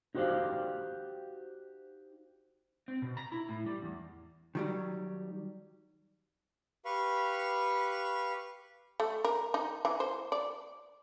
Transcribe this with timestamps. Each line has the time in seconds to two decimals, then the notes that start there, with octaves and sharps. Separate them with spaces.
0.15 D#4 F#4 G4 C5 D5 F5
2.88 C4
3.02 B2
3.17 A#5
3.32 E4
3.49 A2
3.66 G3
3.82 E2
4.55 D#3 F#3 G3
6.85 G4 B4 F5 B5 C#6
9.00 A3
9.24 A#4
9.54 D#4
9.85 E3
10.00 C5
10.32 D5